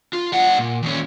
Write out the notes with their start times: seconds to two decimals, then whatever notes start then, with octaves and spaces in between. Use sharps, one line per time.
0.13 F4
0.32 G3 F#5
0.58 A#2
0.83 D#2 C#4